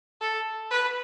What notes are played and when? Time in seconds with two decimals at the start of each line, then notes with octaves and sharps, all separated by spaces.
0.21 A4
0.71 B4